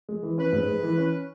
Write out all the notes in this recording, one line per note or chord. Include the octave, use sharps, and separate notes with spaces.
G#3
E3
C#4 B4
G#2
G#3
E3
C#4